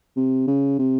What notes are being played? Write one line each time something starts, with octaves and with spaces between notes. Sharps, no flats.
C3
C#3
C3